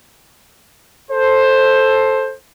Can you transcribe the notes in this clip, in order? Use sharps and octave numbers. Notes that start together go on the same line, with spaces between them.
A4 C5